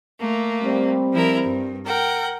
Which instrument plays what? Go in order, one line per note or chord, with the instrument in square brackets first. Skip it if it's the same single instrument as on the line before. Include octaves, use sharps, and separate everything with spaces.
[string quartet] A3 A#3
[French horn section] G3 C4
[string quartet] F3 E4 A#4
G2
A#4 F#5 G5